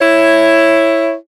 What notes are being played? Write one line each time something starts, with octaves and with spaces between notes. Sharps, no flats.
E4 C#5